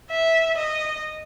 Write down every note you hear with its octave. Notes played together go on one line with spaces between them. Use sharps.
E5
D#5